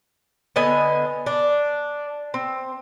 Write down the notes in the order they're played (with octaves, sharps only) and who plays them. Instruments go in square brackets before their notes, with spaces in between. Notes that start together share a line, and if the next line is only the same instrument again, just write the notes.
[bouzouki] D3 B3 D#5 G#5
D4
C4